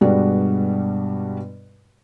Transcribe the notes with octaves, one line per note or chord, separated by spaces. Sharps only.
G2 B2 G3 G#3 D4 F#4